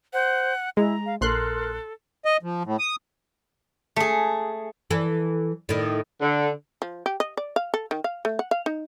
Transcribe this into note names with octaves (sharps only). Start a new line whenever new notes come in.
C5 F#5
G#3 E4 A#5
F5
A#1 A4 A#4 C6 F#6
D#5
F3
A2
D#6
A3 G#4
E3 A4
A2 D#3
D3
F3
G4
D#5
D5
F5
A4
D#3
F5
A3
F#5
F5
D#4